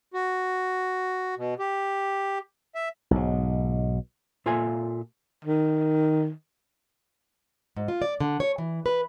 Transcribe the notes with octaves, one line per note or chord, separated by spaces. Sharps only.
F#4
B2
G4
E5
B1 G#2
A#2 F4 A4 E5 G#5
D#3
G#2
F4
D5
D3
C#5
E3
B4